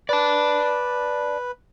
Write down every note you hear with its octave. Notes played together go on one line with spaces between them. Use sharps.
B4 D5 A5